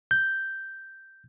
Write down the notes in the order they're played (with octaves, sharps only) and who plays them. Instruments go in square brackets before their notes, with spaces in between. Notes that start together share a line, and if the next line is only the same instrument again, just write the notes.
[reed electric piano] G6